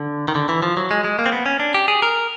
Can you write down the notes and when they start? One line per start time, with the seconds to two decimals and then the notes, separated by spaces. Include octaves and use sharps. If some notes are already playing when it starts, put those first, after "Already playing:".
Already playing: D3
0.28 D#3
0.35 D3
0.49 E3
0.62 F3
0.77 F#3
0.91 G#3
1.04 G#3
1.19 A#3
1.26 C4
1.32 B3
1.46 C#4
1.60 D4
1.74 G4
1.88 G#4
2.02 A#4